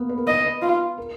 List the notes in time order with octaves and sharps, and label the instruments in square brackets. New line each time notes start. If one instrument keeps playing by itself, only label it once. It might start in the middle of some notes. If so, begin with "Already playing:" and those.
Already playing: [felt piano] A#3 B3
B4
A#4
[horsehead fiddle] D#5
[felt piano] B4
[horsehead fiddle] F4
[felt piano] A#4